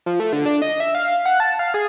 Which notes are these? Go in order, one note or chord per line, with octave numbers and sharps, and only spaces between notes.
F3
A3
D3
D4
D#5
E5
F5
F5
F#5
A5
F5
G#4